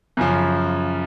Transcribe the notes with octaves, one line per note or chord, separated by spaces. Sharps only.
F#2 C#3 F3